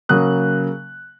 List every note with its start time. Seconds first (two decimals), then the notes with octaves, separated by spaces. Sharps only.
0.09 C#3 F#3 A#3 D#6 F#6